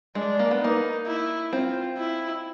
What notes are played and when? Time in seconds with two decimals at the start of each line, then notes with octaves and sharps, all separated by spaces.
0.15 G#3 D4
0.39 A#3
0.51 B3
0.61 A#3 D#4
1.06 E4
1.52 C4 F4
1.98 E4